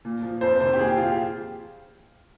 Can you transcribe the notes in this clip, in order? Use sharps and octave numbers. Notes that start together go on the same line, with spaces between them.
A#2
F3
F2 C5
C3 D#3 C5
G4
A#2 G#4
G4
F3 F4
G4